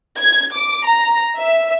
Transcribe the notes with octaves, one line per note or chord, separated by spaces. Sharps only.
G#6
D6
A#5
E5